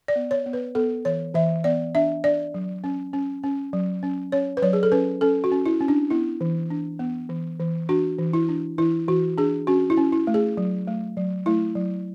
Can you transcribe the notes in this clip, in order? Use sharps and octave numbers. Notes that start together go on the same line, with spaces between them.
D5
B3
C#5
B3
B4
B3 A4
E3 C#5
E3 E5
B3 D5
D4 E5
D4 D5
F#3
C#4
C#4
C#4
F#3
C#4
C#4 C#5
B4
F#3 C#5
G#4
A4
C#4 B4
C#4 A4
F#4
C#4
E4
C#4
D4
B3 E4
E3
D4
B3
E3
E3
D4 F#4
E3
E4
D4
E3 E4
E3 F#4
D4 G#4
C#4 F#4
E4
C#4
E4
A3
G#4
F#3
A3
F#3
A3 E4
F#3